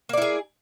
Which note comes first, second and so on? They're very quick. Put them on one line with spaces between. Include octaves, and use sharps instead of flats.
A#3 D5 E4 G#4